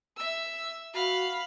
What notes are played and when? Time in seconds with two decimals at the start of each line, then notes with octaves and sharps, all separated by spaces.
0.17 E5 E6
0.94 F#4 F5 B5